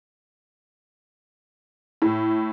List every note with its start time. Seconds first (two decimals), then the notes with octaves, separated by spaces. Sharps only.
2.02 A2